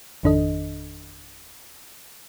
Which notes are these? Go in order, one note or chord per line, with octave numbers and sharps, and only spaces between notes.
G#1 F2 D#3 D4 A4 D#5